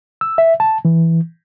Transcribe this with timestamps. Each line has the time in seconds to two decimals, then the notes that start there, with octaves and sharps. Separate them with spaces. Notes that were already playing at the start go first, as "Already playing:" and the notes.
0.21 E6
0.38 E5
0.60 A5
0.85 E3